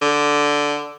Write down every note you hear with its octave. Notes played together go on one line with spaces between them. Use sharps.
D3